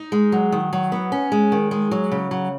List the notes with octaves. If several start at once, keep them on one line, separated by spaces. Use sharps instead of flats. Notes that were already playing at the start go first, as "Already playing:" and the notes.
Already playing: D#4
G#3
F#3
D#3
F#3
B3
C#4
G#3
D#3
G#3
F#3
C#3
F#3